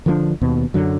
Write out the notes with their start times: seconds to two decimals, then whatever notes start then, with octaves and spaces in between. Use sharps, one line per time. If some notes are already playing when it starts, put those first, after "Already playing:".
0.06 D3 F3 A3 D4
0.41 D#2 B2
0.74 F#2 D3 F#3